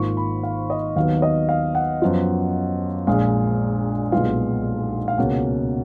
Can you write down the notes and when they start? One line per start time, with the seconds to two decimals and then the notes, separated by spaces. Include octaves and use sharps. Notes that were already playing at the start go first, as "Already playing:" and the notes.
Already playing: G#1 G#2 D#3 A#3 F4 C#6
0.17 B5
0.43 F5
0.70 D#5
0.96 D#2 D#3 F#3 B3 F5
1.22 D#5
1.49 F5
1.75 F#5
2.02 F#2 F3 B3 F4
3.07 A#1 A#2 G#3 F5
4.12 B1 A#2 G#3 B3 F4 F5
5.08 F5
5.18 C#2 B2 A#3 C#4 F#5